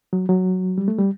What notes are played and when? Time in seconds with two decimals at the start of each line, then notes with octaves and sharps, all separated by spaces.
0.13 F#3
0.29 F#3
0.78 G3
0.88 A3
0.98 G3